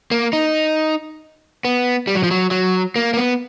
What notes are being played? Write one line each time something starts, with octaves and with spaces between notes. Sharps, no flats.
A#3
D#4
B3
G3
F#3
F3
F#3
F#3
A#3
A#3
B3